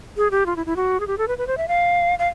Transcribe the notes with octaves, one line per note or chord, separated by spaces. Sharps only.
G#4
G4
F4
E4
E4
F#4
G#4
G4
A4
B4
B4
C5
E5
F5
F5